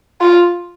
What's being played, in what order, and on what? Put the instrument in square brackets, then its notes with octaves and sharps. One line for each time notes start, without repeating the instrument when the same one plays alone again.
[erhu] F4